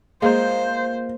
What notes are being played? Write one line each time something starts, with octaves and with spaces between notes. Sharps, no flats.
G#3 A#3 F4 C5